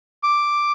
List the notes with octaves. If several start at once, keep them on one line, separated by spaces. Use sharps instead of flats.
D6